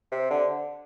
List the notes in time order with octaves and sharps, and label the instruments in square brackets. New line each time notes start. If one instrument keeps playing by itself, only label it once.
[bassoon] C3
D3